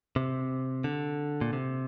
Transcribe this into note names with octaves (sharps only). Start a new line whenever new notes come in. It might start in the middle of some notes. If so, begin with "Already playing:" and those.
C3
D3
A#2
C3